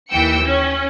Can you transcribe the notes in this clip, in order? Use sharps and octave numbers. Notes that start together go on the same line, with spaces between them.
D#2 E3 G5 E6 C#7
C#4